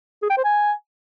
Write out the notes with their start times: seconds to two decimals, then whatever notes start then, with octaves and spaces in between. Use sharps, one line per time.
0.22 G#4
0.30 G5
0.37 C5
0.44 G#5